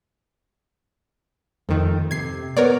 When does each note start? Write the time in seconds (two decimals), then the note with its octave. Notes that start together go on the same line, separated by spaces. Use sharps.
1.69 F2 D#3 A3
2.11 C3 G#6 C7
2.57 B3 A#4 C#5 D5